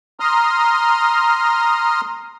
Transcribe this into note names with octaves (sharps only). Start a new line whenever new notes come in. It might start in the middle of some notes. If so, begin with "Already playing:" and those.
A#5 C6 D#6 F6